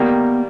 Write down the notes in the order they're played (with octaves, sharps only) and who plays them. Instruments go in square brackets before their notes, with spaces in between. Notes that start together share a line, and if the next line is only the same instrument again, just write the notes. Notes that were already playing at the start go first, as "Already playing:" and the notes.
Already playing: [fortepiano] D#3 G3 A#3 [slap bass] B3